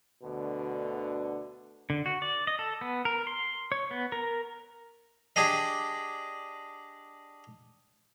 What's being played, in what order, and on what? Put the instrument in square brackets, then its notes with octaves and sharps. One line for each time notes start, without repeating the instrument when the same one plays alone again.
[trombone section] D2 B2 D3
[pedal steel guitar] D3
F#4
D5
D#5
A4
B3
A#4
C6
C#5
B3
A#4
[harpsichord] D4 G4 G#4 D#5